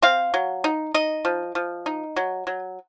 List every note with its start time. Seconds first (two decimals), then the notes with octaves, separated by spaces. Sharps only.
0.02 C4 F5
0.34 F#3
0.64 D#4
0.94 D#4 D#5
1.25 F3
1.55 F3
1.86 D#4
2.16 F#3
2.47 F#3